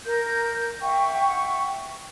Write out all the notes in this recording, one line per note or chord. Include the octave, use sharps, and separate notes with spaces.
A#4 G6
E5 F#5 G5 C#6